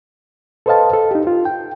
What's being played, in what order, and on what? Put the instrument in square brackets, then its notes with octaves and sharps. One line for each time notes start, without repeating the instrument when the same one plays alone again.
[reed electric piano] A4 B4 C5 D#5 F5 A5
A4
D#4 G4
F4
G5